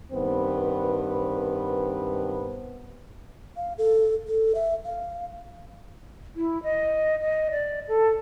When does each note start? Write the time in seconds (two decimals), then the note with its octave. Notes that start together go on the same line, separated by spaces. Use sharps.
0.13 G2 D#3 B3 C4 B4
3.56 F5
3.78 A4
4.27 A4
4.55 E5
4.85 F5
6.36 E4
6.63 D#5
7.20 D#5
7.51 D5
7.88 A4